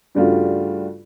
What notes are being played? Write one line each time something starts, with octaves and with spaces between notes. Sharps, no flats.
G2 C#3 G3 A3 F4 F#4